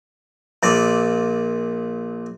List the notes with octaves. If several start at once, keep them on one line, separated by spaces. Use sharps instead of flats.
A#1 A#2 D5